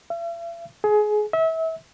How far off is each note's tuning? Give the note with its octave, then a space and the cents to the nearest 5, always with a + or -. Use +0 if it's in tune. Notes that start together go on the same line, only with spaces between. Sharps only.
E5 +45
G#4 +25
E5 -30